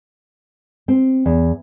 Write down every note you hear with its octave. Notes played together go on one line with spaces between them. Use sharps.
C4
E2